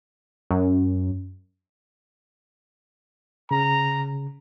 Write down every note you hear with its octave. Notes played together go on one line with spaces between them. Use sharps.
F#2
C#3 A#5